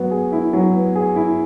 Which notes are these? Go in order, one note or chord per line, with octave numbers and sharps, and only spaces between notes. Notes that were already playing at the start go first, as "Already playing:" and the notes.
Already playing: F#3 B3
G#4
E4
F#3
B3
G#4
E4